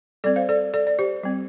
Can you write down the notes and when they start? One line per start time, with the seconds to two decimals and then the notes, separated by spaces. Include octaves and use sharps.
0.24 G3 C4 A4 D5
0.36 C5 F5
0.49 A4 D5
0.74 A4 D5
0.87 D5
0.99 G4 C5
1.23 G3 C4